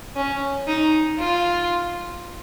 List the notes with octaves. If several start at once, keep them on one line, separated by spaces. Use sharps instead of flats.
C#4
D#4
F4